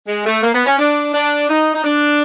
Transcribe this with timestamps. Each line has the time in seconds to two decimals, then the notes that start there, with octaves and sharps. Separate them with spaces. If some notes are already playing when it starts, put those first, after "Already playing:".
0.07 G#3
0.25 A3
0.42 A#3
0.54 B3
0.66 C#4
0.78 D4
1.13 D4
1.48 D#4
1.74 D#4
1.84 D4